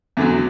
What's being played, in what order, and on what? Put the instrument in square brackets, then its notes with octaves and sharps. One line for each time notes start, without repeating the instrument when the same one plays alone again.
[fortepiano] E2 D3 F#3